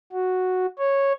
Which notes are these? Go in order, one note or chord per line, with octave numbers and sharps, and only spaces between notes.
F#4
C#5